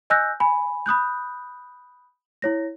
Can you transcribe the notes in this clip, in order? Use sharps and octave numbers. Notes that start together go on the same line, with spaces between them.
D#5 G#5 E6 F#6 G6 A#6
G#5 B5
B5 D#6 F#6 G6
E4 C#5 A#6